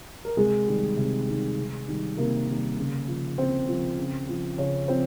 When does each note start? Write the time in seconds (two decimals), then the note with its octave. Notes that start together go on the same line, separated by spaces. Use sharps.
0.25 A#4
0.37 C3 G#3 G#4
0.67 D#3 G3
0.97 C3
1.28 D#3 G3
1.58 C3
1.88 D#3 G3
2.17 C3 A#3 A#4
2.48 D#3 G3
2.78 C#3
3.08 F3
3.38 C#3 C4 C5
3.68 F3
3.98 C#3
4.29 F3
4.58 C#3 C#4 C#5
4.88 F3 C4 C5